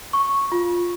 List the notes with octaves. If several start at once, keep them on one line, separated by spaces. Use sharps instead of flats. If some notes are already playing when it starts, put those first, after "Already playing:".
C#6
F4